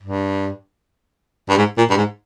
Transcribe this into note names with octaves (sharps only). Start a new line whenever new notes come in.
G2
G2
G#2
A#2
G2
G#2